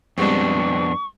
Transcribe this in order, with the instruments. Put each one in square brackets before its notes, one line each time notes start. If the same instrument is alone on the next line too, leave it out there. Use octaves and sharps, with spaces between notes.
[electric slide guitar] F2 B3 D4 [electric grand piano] G3 G#3 C4 [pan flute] C#6